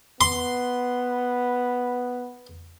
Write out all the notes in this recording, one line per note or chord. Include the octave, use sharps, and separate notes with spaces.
B3 C6